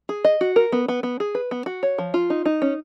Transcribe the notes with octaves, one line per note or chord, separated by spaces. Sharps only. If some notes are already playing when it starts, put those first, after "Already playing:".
G#4
D#5
F#4
A#4
B3
B3
B3
G#4
B4
B3
F#4
C#5
F3
F4
D#4
D#4
C#4